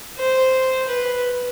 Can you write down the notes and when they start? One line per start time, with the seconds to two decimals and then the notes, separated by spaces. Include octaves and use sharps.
0.18 C5
0.88 B4